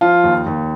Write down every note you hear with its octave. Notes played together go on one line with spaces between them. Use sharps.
F3 F4
D#2
D#2